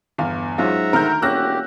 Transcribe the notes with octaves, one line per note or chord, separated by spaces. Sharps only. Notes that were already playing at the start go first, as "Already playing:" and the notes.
G1 E2 F5
G#2 F#3 C#4 F4 E5 F#5 A#5
D2 D#3 A#4 F6 G6
E1 A#3 C#4 F#4 G4 E6 F#6 A#6